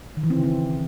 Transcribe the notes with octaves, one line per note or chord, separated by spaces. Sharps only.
D#3
E3
C4
C#3
C4